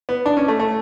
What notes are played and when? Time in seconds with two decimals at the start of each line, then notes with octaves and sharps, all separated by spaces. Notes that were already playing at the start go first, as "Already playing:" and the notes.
0.09 B3
0.26 D4
0.37 C#4
0.48 A3
0.59 A3